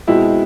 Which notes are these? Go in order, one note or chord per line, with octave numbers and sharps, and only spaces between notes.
B2 G#3 C4 E4